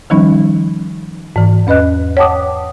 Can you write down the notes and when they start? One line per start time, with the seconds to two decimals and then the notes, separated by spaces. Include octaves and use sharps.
0.10 D#3 F3 G3 C#4 D#4
1.36 G#2 E3
1.67 E2 C#4 B4 D#5 F#6
2.17 C#5 F#5 G5 A5 D6 D#6